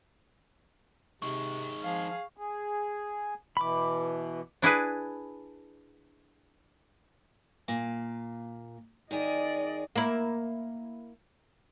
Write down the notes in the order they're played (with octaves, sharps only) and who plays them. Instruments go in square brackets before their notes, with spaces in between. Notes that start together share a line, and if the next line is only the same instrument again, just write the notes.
[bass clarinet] C3 [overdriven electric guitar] D#3 G#3 [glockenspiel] C#6
[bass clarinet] F3 [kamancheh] G#4 F5
[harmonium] G#4
[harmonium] B2 E3 [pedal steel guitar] B5 D6
[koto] D4 E4 G#4 B4
[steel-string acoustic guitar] A#2 A#3 F5
[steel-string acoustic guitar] D#3 G#4 [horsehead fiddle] D5 D#5
[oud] A#3 E4